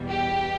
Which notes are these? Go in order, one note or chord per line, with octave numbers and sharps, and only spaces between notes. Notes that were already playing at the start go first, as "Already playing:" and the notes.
Already playing: E2 B2 G3
G4